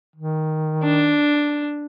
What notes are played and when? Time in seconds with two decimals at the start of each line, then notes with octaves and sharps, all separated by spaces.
0.16 D#3
0.83 D4